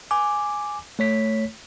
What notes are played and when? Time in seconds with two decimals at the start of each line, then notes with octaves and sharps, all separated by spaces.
0.11 G#5 D6
0.99 A3 C#5 B6